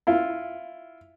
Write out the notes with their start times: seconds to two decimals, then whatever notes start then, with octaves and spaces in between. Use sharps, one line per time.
0.07 E4 F4